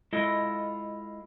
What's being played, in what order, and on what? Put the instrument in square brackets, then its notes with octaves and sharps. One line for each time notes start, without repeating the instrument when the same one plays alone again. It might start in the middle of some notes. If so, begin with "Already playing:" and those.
[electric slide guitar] G#3 E4 F4 A4 D#5